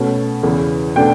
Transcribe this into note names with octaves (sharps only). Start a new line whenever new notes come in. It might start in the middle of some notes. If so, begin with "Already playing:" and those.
Already playing: B2 A3 C#4
E2 C#3 E3
B2 A3 D4 G5